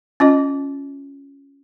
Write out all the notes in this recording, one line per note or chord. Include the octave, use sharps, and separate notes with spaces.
C#4 F4 D#5